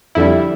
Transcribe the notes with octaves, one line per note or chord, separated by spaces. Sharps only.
F2 D3 G3 E4